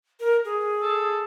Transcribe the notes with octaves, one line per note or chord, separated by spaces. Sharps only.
A#4
G#4
A4